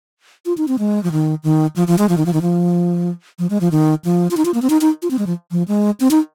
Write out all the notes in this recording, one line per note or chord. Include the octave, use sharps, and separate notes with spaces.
F4
D#4
C4
G#3
F3
D#3
D#3
F3
F3
G#3
F3
D#3
F3
D#3
F3
F3
G#3
F3
D#3
F3
F4
D#4
F4
A#3
C4
D#4
D#4
F4
C4
G#3
F3
F3
G#3
C4
D#4